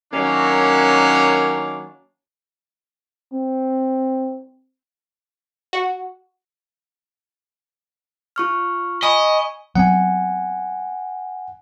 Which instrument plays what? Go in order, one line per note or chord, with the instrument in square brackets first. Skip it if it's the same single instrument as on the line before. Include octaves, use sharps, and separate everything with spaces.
[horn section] D#3 F#3 A#3 C#4 D4
[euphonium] C4
[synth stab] F#4
[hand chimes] F4 C#6 F6
[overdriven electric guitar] D#5 [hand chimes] G#5 B5 C#6
[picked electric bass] F#3 B3 C4 [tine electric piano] F#5 G#5